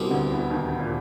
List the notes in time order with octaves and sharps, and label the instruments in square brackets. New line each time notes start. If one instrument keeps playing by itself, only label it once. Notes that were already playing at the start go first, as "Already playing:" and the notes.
Already playing: [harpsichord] C2 B2 G3 C4
[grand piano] D2 D3
E2 E3
D#2 D#3
A2
A#2